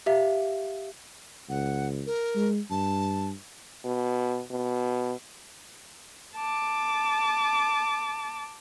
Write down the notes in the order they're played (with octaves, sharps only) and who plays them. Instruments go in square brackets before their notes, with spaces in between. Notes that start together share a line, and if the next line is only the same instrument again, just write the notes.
[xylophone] G4 E5 F5
[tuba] C#2 [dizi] F#5
[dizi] A#4
[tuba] G#3
[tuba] G2 [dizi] A5
[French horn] B2
B2
[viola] A5 D6